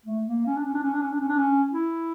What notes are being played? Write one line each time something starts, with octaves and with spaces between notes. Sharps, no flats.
A3
A#3
C#4
D4
C#4
D4
C#4
D4
C#4
D4
C#4
D4
C#4
E4